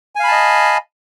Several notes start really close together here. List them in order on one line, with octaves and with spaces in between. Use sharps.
G#5 F5 B5 A5 D#5